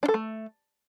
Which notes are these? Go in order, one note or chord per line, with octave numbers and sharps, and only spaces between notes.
D4
A4
A3